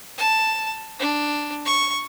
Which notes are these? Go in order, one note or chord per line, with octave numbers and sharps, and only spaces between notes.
A5
D4
C#6